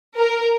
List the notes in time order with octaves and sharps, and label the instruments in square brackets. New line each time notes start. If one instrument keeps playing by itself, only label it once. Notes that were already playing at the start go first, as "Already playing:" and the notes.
[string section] A#4